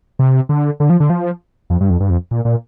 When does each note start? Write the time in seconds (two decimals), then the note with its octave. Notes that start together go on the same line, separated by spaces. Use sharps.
0.19 C3
0.49 D3
0.80 D3
0.90 F3
1.00 D3
1.10 F3
1.70 F2
1.81 G2
1.90 F2
2.00 G2
2.10 F2
2.31 A#2
2.45 A#2